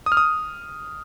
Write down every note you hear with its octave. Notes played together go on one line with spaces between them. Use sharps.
D#6
F6
D#6